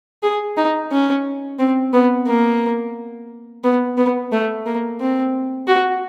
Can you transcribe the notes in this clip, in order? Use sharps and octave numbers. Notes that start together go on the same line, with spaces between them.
G#4
D#4
C#4
C4
B3
A#3
B3
B3
A3
A#3
C4
F#4